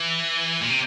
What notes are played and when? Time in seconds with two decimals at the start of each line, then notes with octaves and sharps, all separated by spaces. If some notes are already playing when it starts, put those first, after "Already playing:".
Already playing: E3
0.61 A#2
0.70 C3